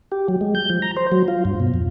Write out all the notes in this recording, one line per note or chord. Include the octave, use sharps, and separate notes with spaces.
G4
F#3
G#3
G6
F3
A#5
C5
F#3
F4
G2
B2
F2